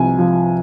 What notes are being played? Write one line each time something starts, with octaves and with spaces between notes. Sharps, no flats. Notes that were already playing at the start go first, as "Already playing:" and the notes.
Already playing: C2 F3 G#5
F3